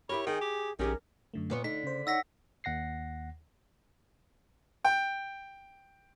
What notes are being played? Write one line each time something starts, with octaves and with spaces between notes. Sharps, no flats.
E4 G4 A#4 C#5 B5
D#3 G#4 G5
G4
A#1 D#3 C#4 G4 G#4 A#4
F#2 D3 A3
A#2 B3 C#5
D3 D#4 B6
C#3 C5
D#4 C#5 F#5 E6 A#6 B6
D#2 F#5 A#6 C7
G5